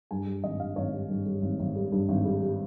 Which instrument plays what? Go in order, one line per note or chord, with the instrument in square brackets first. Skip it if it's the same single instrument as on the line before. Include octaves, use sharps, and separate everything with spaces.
[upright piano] G2 G#5
G3
G#1 D#5
G2 F5
G#1 C#5
G3
G2
G3
G#1
G#1
G3
G2
G#1
G3
G3